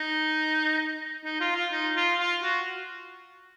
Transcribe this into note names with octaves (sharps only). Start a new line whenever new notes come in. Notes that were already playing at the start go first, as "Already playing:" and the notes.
Already playing: D#4
D#4
F4
F4
D#4
F4
F4
F#4